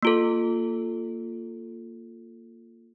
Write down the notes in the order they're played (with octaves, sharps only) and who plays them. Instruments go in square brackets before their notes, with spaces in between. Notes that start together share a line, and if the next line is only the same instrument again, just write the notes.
[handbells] A#3 F4 A4